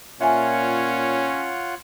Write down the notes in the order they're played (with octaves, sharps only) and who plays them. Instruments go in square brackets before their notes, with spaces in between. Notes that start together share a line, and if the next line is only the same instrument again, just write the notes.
[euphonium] A#2 [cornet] C#4 [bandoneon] F4 C#5 F#5 [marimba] E5 G#5